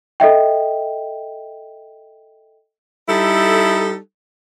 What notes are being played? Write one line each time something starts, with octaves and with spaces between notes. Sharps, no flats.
A4 D#5 E5 G5
G3 D#4 E4 A4